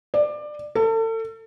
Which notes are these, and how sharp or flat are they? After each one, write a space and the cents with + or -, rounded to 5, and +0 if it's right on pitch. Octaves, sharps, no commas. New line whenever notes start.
D5 +20
A4 +35